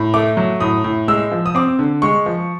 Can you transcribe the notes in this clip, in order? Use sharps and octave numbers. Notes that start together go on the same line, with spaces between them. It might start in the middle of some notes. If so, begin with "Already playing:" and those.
Already playing: A2
A3 D6
F#3
A2 D#6
A2
G#3 E6
F3
D#6
C4 D6
D3
G#3 C#6
F3